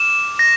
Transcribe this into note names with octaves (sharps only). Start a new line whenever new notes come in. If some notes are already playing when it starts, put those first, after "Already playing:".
Already playing: D6 F6 E7
A#6